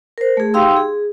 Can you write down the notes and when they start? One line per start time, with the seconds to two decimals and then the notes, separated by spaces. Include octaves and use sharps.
0.18 A#4 C5
0.37 A3 G#4
0.54 D#4 G4 F5 G5 C6 E6
0.76 G#4